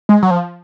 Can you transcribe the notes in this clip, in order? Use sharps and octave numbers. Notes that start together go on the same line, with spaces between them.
G#3
F#3
F3